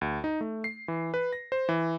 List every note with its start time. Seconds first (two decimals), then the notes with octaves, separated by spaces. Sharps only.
0.01 D2
0.24 D#4
0.41 A3
0.64 C7
0.88 E3
1.14 B4
1.33 A#6
1.52 C5
1.69 E3